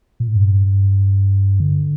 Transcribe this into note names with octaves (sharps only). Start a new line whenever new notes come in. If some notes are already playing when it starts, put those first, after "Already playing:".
A#2
A2
G2
D3